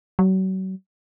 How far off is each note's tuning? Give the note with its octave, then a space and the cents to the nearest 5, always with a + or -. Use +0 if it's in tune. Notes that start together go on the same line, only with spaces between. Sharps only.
F#3 +35